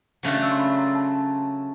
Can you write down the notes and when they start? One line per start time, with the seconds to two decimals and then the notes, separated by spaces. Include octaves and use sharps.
0.23 C#3 F#3 A3 D4 F#4 G6
0.33 A6
0.43 E6
0.51 C6
0.59 B5
0.77 A#5
0.95 A5